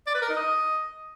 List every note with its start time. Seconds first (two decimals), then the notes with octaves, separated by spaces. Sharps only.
0.07 D5
0.15 B4
0.22 A#4
0.29 D#4
0.37 D#5